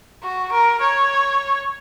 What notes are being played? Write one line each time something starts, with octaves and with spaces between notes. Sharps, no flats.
F#4
A#4
C#5